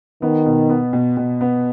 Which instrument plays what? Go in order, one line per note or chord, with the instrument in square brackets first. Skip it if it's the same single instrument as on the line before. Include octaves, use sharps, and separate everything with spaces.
[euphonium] D#3 [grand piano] B3
[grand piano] B2
B3
B2
B2
B3